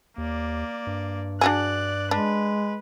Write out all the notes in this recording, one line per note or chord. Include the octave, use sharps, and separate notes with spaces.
D#2 A#3 D5
G2
D4 F#4 G#4 D5 F#6
G#3 D4 B4